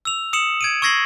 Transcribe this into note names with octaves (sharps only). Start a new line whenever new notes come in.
E6 F7
D#6 C#7 E7 F#7
G#6 D7 D#7
C#6 E6 G#6 A#6 C7 F#7